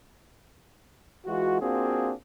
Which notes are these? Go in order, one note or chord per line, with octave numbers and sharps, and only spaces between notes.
E3 G#3 F4 F#4
A#3 C4 D4 F4 F#4 G#4